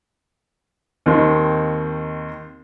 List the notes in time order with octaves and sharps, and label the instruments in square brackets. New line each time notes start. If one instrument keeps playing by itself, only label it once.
[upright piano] D#2 D#3 C4